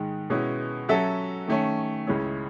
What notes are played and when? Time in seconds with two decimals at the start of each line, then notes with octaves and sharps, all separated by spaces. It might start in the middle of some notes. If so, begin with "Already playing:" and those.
Already playing: G#2 D#3 G#3
0.30 B2 G#3 C#4 E4
0.89 F#3 C#4 F#4 A4 E5
1.48 D#3 A3 C#4
2.07 C#2 C#3 G#3 C#4 E4